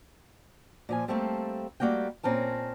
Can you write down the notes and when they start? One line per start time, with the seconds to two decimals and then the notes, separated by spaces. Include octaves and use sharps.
0.89 A#2 F3 G#5
1.08 G3 A3 A#3 C4 G4 A4
1.80 G3 A3 A#3 F#4 G5
2.23 A#2 C4 C#4 A#4 A5